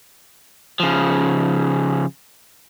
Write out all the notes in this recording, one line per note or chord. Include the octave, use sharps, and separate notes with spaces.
C#3 F3